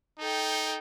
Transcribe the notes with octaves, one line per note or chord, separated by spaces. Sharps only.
D#4 A4 G5